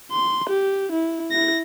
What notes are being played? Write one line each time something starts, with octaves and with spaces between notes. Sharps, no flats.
C6
G4
E4
E4 A#6